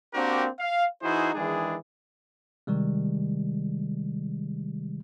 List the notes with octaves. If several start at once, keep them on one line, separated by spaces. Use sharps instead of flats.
A#3 C4 D4 F#4 G4 A#4
F5
E3 D#4 E4 F#4 G#4 C5
D#3 E3 G#3 D4 G#4
C3 D#3 G3 G#3